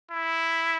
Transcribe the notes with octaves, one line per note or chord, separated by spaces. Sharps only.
E4